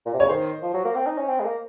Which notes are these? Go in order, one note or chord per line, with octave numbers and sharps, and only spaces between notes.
A#2
C3
C#3 C#5
D#3 C5
F3
F#3
A#3
C4
D#4
C#4
C4
G#3
A#3